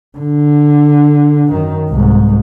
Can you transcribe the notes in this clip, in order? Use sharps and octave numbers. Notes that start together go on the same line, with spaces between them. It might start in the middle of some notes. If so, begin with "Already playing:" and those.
D3
F#2 D#3
C2 G#2